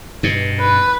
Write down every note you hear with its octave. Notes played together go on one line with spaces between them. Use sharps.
G2 B2
B4